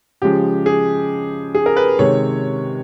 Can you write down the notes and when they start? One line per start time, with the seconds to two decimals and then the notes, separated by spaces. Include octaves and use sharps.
0.22 C#3 F3 G#3 G4
0.66 G#4
1.55 G#4
1.66 A#4
1.76 B4
1.99 C3 D#3 G#3 C#5